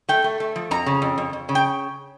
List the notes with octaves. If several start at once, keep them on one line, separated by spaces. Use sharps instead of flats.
A3 G5
A3
A3
F3
F2 A#5
C#3
F2
F2
F2
C#3
G5